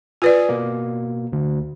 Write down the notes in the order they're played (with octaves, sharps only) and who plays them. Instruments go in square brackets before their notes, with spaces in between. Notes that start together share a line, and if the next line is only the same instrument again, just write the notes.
[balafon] F4 B4 D5 [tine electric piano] G#5 D#6
[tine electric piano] B2 A#3
D2